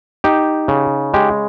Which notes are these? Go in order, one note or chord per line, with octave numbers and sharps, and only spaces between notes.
D#4 G4
C#3
G#3 G4